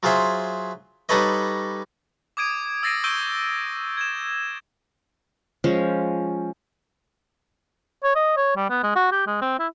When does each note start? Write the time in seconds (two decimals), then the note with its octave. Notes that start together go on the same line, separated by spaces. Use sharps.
0.03 F#3 F4 G#4 C5 E5
1.09 G3 D#4 A4 B4 C#5 D#5
2.37 D6 D#6 G#6 D7 D#7
2.83 E6 A6 A#6 C7 D7 D#7
3.04 C#6 E6 G6 D7 D#7 G7
3.97 G#6 E7
5.64 F3 G#3 C#4
8.03 C#5
8.15 D#5
8.37 C#5
8.56 G3
8.70 B3
8.83 G#3
8.96 F#4
9.12 G4
9.27 G#3
9.41 C4
9.59 E4